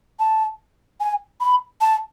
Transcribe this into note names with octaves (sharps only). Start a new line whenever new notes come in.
A5
G#5
B5
A5